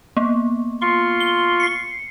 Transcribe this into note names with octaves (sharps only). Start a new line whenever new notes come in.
A#3 B3
F4 C6 C#6
G7
C7 C#7